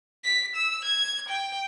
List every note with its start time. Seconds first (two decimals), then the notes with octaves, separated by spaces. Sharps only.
0.24 B6
0.55 E6
0.84 G#6
1.29 G5